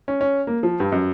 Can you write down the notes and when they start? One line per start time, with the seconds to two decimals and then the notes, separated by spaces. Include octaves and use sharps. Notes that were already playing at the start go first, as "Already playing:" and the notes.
0.08 C#4
0.21 C#4
0.47 A#3
0.63 F3
0.80 G2
0.92 F#2